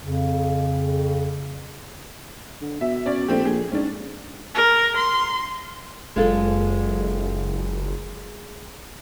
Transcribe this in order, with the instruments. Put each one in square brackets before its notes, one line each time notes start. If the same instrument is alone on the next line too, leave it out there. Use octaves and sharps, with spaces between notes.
[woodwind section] F2 C#3
[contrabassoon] D3
[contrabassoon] B2 [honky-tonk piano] E5
[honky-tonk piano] C#4 D5
[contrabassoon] A#1 [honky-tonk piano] A3 C4 G4
[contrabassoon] A#1 [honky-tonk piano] G#4
[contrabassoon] G#2 [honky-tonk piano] C#4 D4
[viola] A#4
C6
[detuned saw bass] F#1 [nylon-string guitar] G#3 F4 A4